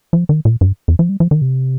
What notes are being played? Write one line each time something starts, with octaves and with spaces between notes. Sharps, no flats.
F3
D#3
A#2
G2
F2
F3
G3
F3
D#3
C3